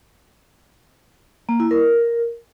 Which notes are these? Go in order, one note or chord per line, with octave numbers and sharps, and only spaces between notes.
A#3
E4
A#4